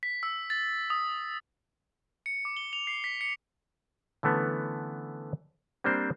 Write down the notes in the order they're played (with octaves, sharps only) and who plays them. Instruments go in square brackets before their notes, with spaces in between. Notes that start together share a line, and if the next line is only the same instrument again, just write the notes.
[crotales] B6
E6
A6
D#6
C#7
D6
G7
F7
C7
B6
C#7
[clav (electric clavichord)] D3 E3 A3 B3 C#4
G3 A#3 C4 D4 A#4 C5